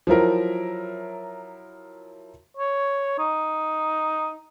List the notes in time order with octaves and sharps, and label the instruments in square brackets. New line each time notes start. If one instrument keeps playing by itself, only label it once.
[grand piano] F3 F#3 E4 A#4
[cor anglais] C#5
D#4